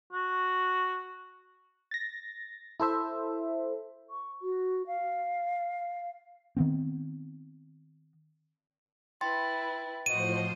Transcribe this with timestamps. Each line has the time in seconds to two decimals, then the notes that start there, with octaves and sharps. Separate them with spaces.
0.13 F#4
1.91 A6 A#6
2.80 E4 A4 C5 E5
4.10 C#6
4.42 F#4
4.87 F5
6.57 D#3 B3 C4
9.21 E4 B4 G5 C6 A6
10.06 A2 F3 F#4 C5 D#5 D#7